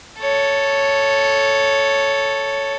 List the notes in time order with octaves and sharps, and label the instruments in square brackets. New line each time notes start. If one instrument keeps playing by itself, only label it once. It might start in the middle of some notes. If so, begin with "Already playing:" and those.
[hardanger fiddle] A4 C#5